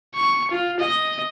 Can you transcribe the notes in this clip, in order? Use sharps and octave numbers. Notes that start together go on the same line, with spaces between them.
C#6
F4
D#5